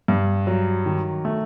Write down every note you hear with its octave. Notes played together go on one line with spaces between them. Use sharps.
G2
F#3
D#3
A3